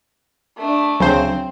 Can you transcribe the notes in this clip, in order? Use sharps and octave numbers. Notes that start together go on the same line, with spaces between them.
A3 D4
D2 C#3 F#3 C4 C5